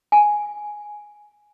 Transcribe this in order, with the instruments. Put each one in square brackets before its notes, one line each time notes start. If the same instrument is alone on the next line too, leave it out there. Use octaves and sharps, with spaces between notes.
[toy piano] G#5